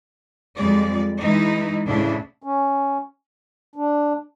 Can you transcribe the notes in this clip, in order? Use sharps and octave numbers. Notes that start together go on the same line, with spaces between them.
F2 G3 G#3 D5
E3 G#3 D#4 E4
D2 A2 C#3 D4 E4
C#4
D4